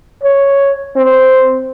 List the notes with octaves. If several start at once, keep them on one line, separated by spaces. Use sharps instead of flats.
C#5
C4